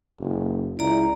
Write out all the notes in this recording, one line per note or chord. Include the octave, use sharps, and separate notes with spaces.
F#1
C#2 E4 D5 A#5